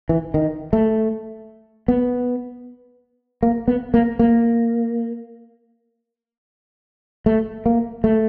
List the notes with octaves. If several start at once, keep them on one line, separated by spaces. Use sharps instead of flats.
E3
D#3
A3
B3
A#3
B3
A#3
A#3
A3
A#3
A3